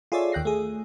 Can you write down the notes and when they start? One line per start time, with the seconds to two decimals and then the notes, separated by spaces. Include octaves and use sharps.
0.12 F4 G#4 A4 C#5 D5 E5
0.32 D#2 G5 F#6 A#6 C7
0.45 A3 G#4